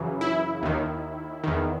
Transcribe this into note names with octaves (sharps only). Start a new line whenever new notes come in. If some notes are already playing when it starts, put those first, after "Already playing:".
Already playing: F#2 C#3 E3
E4
D#2 D#3
E2 D#3